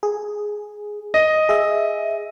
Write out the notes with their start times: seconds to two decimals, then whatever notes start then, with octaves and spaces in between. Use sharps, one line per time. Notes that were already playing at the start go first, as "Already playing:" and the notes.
0.03 G#4
1.14 D#5
1.49 G#4 E5